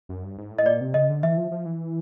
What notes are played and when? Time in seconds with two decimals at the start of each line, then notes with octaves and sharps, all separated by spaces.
0.09 F#2
0.24 G2
0.38 G#2
0.51 A2
0.59 D#5
0.66 A#2 D5
0.81 C3
0.94 C#3 D#5
1.09 D3
1.23 E3 E5
1.37 F3
1.51 F3
1.66 E3